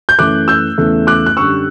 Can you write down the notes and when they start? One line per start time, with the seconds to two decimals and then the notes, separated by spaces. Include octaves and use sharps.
0.09 G6
0.19 F#2 E3 A3 D6 F#6
0.48 E6 G6
0.78 E2 C#3 E3 A3
1.07 D6 F#6
1.26 F#6
1.37 F#2 D3 G3 C#6 E6